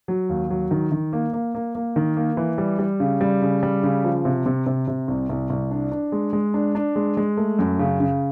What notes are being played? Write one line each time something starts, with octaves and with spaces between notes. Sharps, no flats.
F#3
D#2
F#3
D#3
D#3
A#3
A#3
A#3
A#3
D#3
A#3
E3
G3
G3
C#3
G3
C#3
G3
C#3
F3
C3
C3
C3
C3
C2
C2
C2
D4
D4
G#3
G#3
D4
D4
G#3
G#3
A3
F#2
C#3
C#3